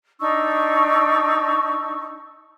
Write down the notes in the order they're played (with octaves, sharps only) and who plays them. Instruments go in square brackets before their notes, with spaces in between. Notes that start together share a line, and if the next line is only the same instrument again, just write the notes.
[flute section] D4 D#4 C#6 E6